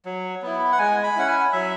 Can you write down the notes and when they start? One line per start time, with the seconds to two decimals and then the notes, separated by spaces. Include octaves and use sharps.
0.05 F#3
0.42 B3 E4
0.72 F#5
0.79 G#3 G#5
1.03 B5
1.16 C#4 E4 F#5
1.28 G#5
1.53 F#3 E5